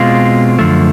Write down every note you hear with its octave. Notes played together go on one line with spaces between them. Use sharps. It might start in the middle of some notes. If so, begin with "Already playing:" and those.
Already playing: B2 G#3 C4 F4
F#2 D3 F3 A3